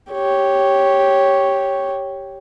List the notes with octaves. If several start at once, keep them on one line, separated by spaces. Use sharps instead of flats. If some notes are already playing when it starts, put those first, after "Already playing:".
G4 C#5